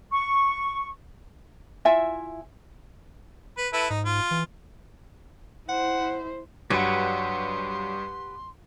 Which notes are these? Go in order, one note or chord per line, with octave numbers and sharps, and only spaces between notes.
C#6
E4 F4 E5 G#5
B4
E4 A4 B4
G#2 D#4
F4
E3
E4 C5 F#5
G2 F#3 G4 B4 F#5 C6